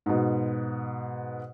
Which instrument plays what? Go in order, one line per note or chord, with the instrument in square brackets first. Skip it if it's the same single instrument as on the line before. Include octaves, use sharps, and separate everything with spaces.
[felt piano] G#2 B2